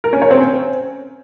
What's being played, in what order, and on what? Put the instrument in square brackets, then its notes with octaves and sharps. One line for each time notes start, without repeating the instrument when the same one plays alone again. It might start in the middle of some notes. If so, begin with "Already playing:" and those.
[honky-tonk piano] A#4
C#4
C#5
C4
C#4